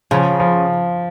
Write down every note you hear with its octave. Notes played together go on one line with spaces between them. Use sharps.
C#3 F3
F3